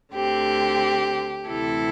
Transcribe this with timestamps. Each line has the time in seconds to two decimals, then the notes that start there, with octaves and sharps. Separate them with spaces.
0.14 D2 D3 C4 G4
1.48 D2 C3 E3 C4 E4 A4